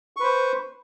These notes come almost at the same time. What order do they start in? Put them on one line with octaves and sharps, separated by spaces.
C#6 B4 C5